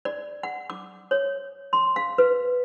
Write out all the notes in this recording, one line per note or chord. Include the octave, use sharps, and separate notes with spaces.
D5
F#5
D6
C#5
C6
F5
B4